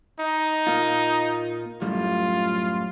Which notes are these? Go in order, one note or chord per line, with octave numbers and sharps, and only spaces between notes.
D#4
A#2 A#3 F4
F#2 A2 G3 F4